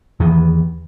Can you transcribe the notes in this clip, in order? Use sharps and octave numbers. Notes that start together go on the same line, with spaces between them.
E2 D#3 E3